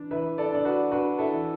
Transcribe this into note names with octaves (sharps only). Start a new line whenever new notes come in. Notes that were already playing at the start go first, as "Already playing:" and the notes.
Already playing: E3 D4
E3 B4 E5
A4 D5
D4 D5
F#4 B4
D4 F#4 B4
E4 A4
E3